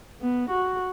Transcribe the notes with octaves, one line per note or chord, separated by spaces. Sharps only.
B3
F#4